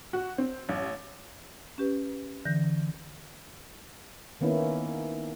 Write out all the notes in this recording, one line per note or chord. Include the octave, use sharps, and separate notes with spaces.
F#4
C4
A1
C#4 G4 B4
D3 E3 G6 A#6
D#3 A#3 B3 C#4 E4